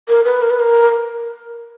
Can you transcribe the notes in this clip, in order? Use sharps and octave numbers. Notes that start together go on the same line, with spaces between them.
A#4
B4
A#4
B4
A#4